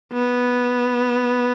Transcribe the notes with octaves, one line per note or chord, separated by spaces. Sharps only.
B3